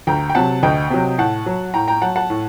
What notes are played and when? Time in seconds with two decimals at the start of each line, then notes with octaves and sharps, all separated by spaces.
0.07 D2 G5 A#5
0.30 G5
0.35 C3 F#3 F#5 A5
0.63 D2 D#5 G5
0.90 C3 F#3
1.18 A2 F#5 A5
1.46 F#3
1.74 A2 G5 A#5
1.88 G5 A#5
2.02 F#3 F#5 A5
2.16 F#5 A5
2.30 A2